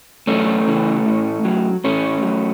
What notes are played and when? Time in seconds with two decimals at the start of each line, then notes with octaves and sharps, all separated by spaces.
0.27 F#2 A3 C#4
0.67 C#3 E3
1.06 A2
1.45 F#3
1.84 A2 A3 C#4
2.23 F#3